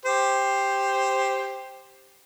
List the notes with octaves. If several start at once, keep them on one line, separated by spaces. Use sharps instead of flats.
G4 C5